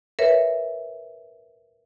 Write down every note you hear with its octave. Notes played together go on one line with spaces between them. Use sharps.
A#4 B4 C#5 E5